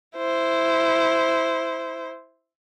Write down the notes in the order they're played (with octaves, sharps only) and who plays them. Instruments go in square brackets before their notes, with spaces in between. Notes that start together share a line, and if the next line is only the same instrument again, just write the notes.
[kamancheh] E4 C5